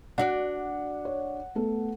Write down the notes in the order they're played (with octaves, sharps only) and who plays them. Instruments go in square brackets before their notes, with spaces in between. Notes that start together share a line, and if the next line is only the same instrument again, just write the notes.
[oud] D4 F#4 D5 [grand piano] F#5
[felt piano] C#5
A3 B3 A4